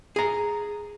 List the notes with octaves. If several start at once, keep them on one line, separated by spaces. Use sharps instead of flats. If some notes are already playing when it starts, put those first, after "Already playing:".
G#4 A#5